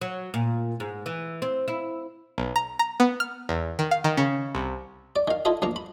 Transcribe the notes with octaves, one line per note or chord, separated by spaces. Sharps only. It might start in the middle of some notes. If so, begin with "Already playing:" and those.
F#3
A#2
G#2
E3
C4
E4
B1
A#5
A#5
B3
F6
E2
D#3
F5
D#3
C#3
C2
D5
D#3 F5
E4 F4 A4 D#5 E5
D2 F3 A#3 A#5
B5